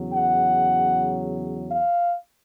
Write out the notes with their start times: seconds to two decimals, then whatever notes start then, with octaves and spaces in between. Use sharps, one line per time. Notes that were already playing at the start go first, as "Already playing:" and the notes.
Already playing: E2 C#3 F#3
0.14 F#5
1.71 F5